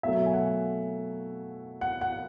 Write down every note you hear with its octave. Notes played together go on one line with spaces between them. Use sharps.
B2 F#3 A3 E5
G#5
F#5
F#5
F#5